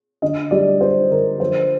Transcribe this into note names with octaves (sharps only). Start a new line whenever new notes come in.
D3 D#5
G3 D5
D4 C5
D3 A#4
F3 C5